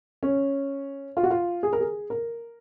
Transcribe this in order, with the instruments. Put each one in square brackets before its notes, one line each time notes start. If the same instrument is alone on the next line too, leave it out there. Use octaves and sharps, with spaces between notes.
[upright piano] C#4
F4
F#4
F4
G#4
A#4
G#4
A#4